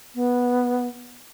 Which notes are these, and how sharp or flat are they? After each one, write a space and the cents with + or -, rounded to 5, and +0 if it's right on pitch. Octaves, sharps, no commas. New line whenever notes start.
B3 -10